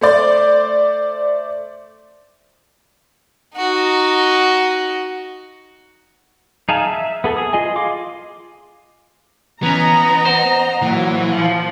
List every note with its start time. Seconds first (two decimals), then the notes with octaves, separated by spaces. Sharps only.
0.01 A3 C5 D5
3.57 D#4 F#4
6.69 D#4 G#4 F5 A5
6.87 E5
7.24 B3 G#4 A4
7.37 G#4 D#6
7.53 F4 G#4 D#5 G#5
7.76 F4 D#5 F5 C6 D6
9.63 E3 B3 C#4 D#5 A#5
10.25 C5 F#5
10.82 A#2 E3 F#3
11.30 F3